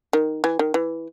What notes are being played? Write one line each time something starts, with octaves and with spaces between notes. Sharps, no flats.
D#3
E3
D#3
E3